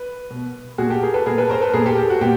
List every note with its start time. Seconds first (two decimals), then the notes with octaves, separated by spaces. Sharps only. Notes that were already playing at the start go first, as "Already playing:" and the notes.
Already playing: B4
0.30 B2
0.78 A#2 F#4 G#4
0.90 G4 A4
1.02 G#4 A#4
1.14 A4 B4
1.26 A#2 G#4 A#4
1.38 A4 B4
1.50 A#4 C5
1.61 A4 B4
1.74 A#2 G#4 A#4
1.86 G4 A4
1.98 G4
2.10 F#4
2.21 A#2 G4